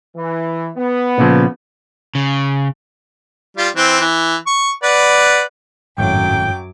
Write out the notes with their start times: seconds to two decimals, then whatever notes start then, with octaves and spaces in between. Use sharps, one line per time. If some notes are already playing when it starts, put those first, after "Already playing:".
0.16 E3
0.76 B3
1.18 A#2 C#3 F3
2.15 C#3
3.57 G3 F4
3.76 E3 C4
4.00 E3
4.47 C#6
4.83 B4 D5 F#5
5.98 G#1 F#2 A2 F#3 G5 D6